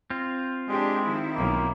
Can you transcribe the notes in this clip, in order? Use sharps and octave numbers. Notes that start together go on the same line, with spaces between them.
C4 F4
G#3 D4 G4
D#3 E4
B1 A#3